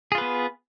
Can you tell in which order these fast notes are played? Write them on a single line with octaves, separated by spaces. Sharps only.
G#4 F4 B4 B3